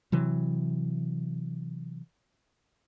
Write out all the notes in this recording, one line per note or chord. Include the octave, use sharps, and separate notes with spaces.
C3 E3 F#3